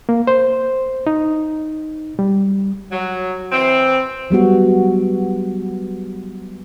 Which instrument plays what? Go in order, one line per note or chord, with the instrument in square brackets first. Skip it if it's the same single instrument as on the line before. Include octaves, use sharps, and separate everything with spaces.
[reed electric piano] A#3
C5
D#4
G3
[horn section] F#3
E3 C4
[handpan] F#3 G3 B3 F#4